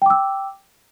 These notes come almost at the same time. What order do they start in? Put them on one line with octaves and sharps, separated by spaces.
G5 D6 E6